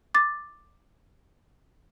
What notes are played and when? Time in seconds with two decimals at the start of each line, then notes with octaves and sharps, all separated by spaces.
0.15 D6 A6